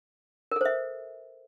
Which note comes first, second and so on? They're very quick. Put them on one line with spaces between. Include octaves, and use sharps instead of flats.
A#4 A4 C5 E5